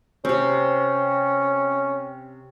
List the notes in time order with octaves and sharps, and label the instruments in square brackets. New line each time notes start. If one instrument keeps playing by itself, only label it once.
[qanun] C3 C4 [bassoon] C#4